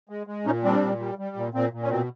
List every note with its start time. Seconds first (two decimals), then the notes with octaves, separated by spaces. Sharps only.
0.09 G#3
0.27 G#3
0.46 A#2 C#4 D#4
0.64 G3 C4 D4
0.81 A#2
0.99 G3
1.18 G3
1.36 A#2
1.54 A#2 C4
1.73 A#2
1.83 C#4
1.90 B2 C4